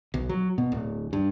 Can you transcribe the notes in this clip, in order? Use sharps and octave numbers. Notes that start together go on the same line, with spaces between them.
B1
F#3
B2
D1
G2